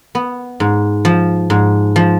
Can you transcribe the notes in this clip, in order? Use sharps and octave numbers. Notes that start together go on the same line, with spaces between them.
B3
G#2
F3
G#2
F3